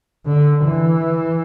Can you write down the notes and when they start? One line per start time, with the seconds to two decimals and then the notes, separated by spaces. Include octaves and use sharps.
0.25 D3
0.64 E3